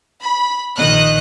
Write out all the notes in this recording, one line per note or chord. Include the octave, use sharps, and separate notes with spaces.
B5
A#1 D#3 D#5 F#6